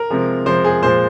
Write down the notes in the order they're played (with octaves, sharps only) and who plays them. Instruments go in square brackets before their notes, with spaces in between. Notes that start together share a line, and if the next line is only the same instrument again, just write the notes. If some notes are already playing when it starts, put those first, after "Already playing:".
Already playing: [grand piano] A#4
C3 F3 G#3
C3 F3 G#3 C5
G#4
A#2 F3 G#3 C5